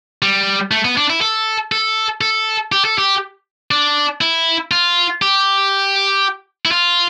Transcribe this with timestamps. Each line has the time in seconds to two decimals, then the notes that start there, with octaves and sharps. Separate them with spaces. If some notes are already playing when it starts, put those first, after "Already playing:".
0.22 G3
0.71 A3
0.85 B3
0.97 D4
1.10 E4
1.21 A4
1.72 A4
2.21 A4
2.72 G4
2.85 A4
2.98 G4
3.71 D4
4.21 E4
4.71 F4
5.22 G4
6.65 E4
6.71 F4